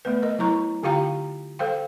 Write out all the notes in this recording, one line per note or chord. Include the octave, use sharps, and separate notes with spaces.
A3 B3 B4
A#4 D#5
F#3 E4 A#5 C#6
D3 F4 G4 F5 G5 A#5
A4 C5 F5 G5